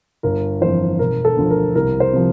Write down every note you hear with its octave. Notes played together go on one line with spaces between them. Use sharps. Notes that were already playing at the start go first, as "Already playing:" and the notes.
G1 A#4
F2 E3 C5
E1 A#4
A4
D2 D3 F3
A#4
C2 A#4
C5
C3 F3